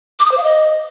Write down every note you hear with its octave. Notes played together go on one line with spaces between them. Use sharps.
D6
D#6
C5
F5
D#5